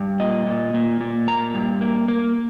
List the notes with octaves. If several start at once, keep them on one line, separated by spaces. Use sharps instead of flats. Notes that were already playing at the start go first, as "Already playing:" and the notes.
Already playing: G2
A#2 D#5
A#2
A#2
A#2
A#3 A#5
G2
A#3
A#3